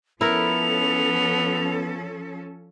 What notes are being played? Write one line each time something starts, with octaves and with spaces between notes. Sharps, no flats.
F3 B3 C#4 E4 A4 A#4 F7